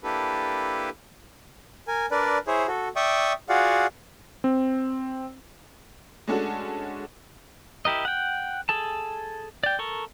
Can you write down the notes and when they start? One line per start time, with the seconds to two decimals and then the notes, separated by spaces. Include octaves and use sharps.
0.04 A#3 D4 E4 G4 A4 B4
1.88 A#4 G#5
2.11 D4 A#4 B4 D5
2.47 E4 G#4 C5 C#5
2.68 F#4 A4
2.96 D5 E5 G5 C#6 D#6
3.49 F4 F#4 G#4 D5 F5 F#5
4.44 C4
6.28 G#3 A3 C#4 D4 F#4 A4
7.85 E4 G4 A#4 D#5
8.05 F#5 G5
8.69 G#4 A4 A5
9.64 D5 G5
9.79 A4 A#4 C#6